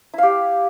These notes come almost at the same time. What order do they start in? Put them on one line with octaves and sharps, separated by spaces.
E4 F5 G4